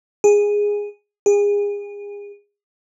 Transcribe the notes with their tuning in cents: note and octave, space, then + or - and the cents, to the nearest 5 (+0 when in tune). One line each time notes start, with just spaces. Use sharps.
G#4 -10
G#4 -30